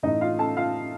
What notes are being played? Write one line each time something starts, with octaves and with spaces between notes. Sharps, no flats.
A1 A2 A3 D#4 D#5
F4 F5
A4 A5
F4 F5